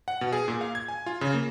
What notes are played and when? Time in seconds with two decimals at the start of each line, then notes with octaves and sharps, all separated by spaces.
0.08 F#5
0.21 B2
0.32 G#4
0.48 A#2
0.61 F5
0.75 G#6
0.88 G#5
1.06 F4
1.21 C#3
1.34 A#3